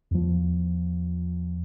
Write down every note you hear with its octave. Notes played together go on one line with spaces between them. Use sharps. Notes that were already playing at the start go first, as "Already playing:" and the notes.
E2 F3